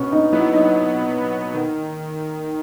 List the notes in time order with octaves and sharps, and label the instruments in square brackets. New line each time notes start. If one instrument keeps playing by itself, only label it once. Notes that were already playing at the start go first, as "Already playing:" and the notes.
Already playing: [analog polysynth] B2 [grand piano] C#4
[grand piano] D#4
[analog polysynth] F#3 B3 [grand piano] E4
[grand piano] D#4
[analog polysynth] B2
F#3 B3
D#3